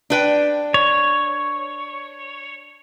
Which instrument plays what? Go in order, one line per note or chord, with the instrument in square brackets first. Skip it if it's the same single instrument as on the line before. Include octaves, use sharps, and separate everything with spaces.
[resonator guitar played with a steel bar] D4 B4 G5
[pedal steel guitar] C#5